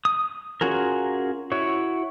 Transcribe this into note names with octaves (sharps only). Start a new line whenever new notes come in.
D#6
C#4 F4 F#4 G#4 A#4
E4 F#4 C#5